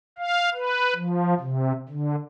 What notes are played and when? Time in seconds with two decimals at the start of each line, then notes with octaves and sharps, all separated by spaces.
0.18 F5
0.54 B4
0.96 F3
1.40 C3
1.89 D3